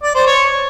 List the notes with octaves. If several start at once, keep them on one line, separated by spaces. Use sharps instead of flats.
D5
C5
C#5